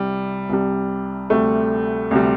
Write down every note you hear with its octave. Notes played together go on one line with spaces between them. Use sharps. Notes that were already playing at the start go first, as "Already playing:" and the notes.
Already playing: C2 C3 G3
C2 C3 G3
D2 C3 G3 A3
D2 C3 G3